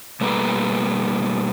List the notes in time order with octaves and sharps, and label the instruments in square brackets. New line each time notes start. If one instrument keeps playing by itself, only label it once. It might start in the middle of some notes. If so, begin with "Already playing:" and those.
[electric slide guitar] B2 G3 A3 A#3 B4 A#5